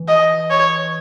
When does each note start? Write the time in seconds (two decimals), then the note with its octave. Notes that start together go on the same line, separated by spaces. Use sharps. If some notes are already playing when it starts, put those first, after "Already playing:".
Already playing: E3
0.08 D#5
0.50 C#5